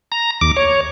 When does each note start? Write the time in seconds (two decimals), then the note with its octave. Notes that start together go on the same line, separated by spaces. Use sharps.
0.12 A#5
0.41 D#2 D6
0.57 C#5